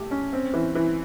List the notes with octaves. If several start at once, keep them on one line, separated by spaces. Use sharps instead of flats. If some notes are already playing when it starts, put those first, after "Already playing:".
Already playing: A3 G4
C#4
C4
E3
E3